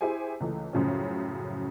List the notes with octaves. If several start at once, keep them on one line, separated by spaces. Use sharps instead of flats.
E4 G4 G#4 C5 G#5
C#2 E3 A3
F#2 A2 C#3 F3 C#4